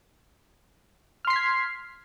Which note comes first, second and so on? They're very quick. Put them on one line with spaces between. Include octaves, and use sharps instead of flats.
F6 C6 C7 B6 G#6